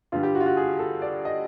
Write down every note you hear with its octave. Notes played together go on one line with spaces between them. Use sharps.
G2 D3 G3 F4
G4
F#4
F4
F#4
G#4
A4
D5
D#5